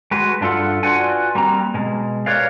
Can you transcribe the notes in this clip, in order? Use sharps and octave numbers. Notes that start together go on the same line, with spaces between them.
G#3 F#4 B4
G2 D4 F4 A4 F#5
F4 F#4 B4 D5 F#5 G#5
G3 A#3 C4 A#5
B2 G#3
G4 A#4 B4 C#5 D5 F5